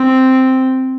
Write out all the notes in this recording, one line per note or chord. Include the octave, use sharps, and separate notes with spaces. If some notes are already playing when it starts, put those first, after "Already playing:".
Already playing: C4